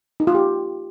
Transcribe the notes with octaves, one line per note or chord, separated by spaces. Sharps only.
D#4
F4
G4